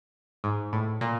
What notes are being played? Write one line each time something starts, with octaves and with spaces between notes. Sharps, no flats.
G#2
A2
A#2